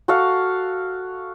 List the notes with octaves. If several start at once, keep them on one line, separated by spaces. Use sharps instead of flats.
F#4 A4 F5